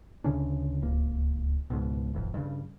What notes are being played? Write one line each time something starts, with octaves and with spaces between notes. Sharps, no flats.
D2 C#3 C#4 D4
D1 C#2 A#3
C#2 G#2 B2
D#1 A1 F2
G2 C#3